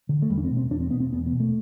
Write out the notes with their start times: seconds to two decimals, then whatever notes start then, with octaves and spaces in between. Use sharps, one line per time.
0.09 D3
0.22 A3
0.30 E2 G3
0.38 D4
0.44 C4
0.51 B2
0.57 C4
0.70 E2 D4
0.80 C4
0.91 B2 B3
1.00 C4
1.13 E2 B3
1.26 B3
1.32 B2
1.40 A3